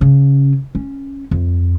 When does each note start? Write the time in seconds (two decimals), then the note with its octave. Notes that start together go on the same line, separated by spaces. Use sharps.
0.01 C#3
0.75 C#4
1.31 F2